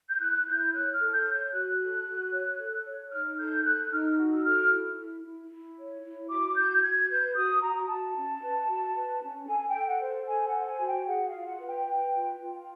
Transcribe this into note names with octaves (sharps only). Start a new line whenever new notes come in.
G6
E4 F#6
E4 G6
C#5 F#6
F6
A4
G6
C#5
G6
F#4 F#6
A4
F#4
C#5
A4
C#5
D#4 F6
A4 G6
A4 F#6
D#4 F6
F#4
E6
A4 F6
E4
E4
E4
E4
C#5
E4
F#4 D6
F#4 G6
F#4 G#6
B4 G6
F#4 D#6
F#4 A#5
F#4 A5
C#4
B4
F#4
B4
C#4
A4 G#5
G5
A4
F#5
C5
A4 G#5
F#5
C5
G#5
F#4
G5
G#4 F#5
F5
F4
F#5
B4
G5
B4
F4
F4